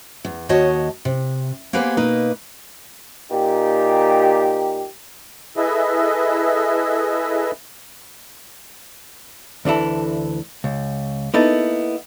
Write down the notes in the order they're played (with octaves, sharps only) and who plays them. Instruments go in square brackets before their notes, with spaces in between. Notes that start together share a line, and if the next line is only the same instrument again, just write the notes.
[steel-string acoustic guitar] E2
D#2 F#4 C#5 D#5 A5
C3
A#3 B3 G4 G#4 B4 C5
B2 A#3 D#4 B4
[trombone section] A#2 D#4 G4
[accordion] E4 G#4 A4 B4 D#5 E5
[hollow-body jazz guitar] D2 D3 E3 E4 A4
C#2
A#3 B3 D#4 E4 A4